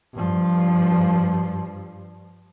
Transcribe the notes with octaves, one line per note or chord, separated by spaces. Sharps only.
G2 F3